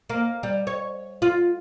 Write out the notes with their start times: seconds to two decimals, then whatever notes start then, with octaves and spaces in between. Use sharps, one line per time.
0.10 A#3
0.43 G3
0.67 C#5
1.22 F4